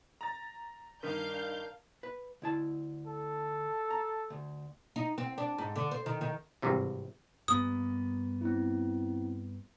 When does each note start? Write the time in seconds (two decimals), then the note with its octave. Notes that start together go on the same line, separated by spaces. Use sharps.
0.21 A#5 A6
1.03 G2 D#3 D4 A#4 F5 G6
2.03 B4
2.42 D2 E4 A5
3.07 A4
3.91 A#5
4.30 D2
4.96 D#4
5.18 C4
5.38 D4
5.58 G#2
5.76 D3
5.91 C5
6.06 D#3
6.21 D#3
6.62 G#1 G2 C3 E3
7.48 G2 A#3 B3 D#6
8.41 C4 E4